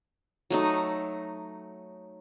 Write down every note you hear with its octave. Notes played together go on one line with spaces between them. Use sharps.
F#3 A3 D#4